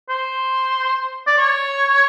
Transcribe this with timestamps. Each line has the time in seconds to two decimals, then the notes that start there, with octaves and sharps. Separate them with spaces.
0.09 C5
1.27 D5
1.38 C#5